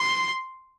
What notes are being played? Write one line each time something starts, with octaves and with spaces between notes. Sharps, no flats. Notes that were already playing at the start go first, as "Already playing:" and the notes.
Already playing: C6